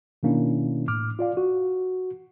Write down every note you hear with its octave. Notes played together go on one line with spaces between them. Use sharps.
B2 D#3 A#3 C#4 D4 E4
A2 D6 F6
F4 D5 F5
F#4